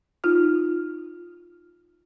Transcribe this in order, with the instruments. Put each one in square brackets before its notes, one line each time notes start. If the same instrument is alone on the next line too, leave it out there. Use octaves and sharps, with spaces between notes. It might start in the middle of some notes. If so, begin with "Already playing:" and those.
[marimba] D#4 F4 F6